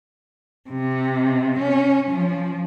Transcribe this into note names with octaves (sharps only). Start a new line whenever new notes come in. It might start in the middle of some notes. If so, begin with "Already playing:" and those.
C3
C#4
F3